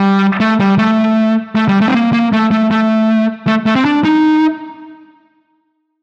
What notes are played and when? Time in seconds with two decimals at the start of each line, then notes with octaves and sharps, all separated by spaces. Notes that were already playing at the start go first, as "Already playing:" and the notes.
Already playing: G3
0.40 A3
0.60 G3
0.78 A3
1.55 A3
1.69 G3
1.81 A3
1.88 C4
1.94 A#3
2.13 A#3
2.33 A3
2.51 A3
2.71 A3
3.47 A3
3.66 A3
3.75 C4
3.85 D4
4.05 D#4